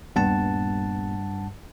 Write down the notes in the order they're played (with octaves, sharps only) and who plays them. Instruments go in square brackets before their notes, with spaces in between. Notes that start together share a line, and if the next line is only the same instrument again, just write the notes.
[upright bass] D#1 B3 [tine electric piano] G2 F#5 A5